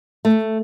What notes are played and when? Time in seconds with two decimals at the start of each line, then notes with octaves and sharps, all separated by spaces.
0.25 A3